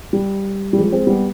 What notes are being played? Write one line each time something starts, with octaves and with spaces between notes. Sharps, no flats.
G3
G3
F3 G#3
G#3 C4
G3 B3